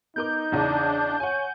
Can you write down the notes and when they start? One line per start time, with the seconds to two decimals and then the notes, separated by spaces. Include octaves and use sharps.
0.16 B3 D#4 A#4 D6 G6
0.52 E2 C#3 D4 D#5
1.20 C#5 F#5 G#5